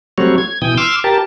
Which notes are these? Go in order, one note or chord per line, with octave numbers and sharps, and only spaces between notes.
F#3 G3 A3 C4 F#4 C#5
G#6
B2 E3 G5 D#6
C6 D6 E6 F6
G4 A#4 A5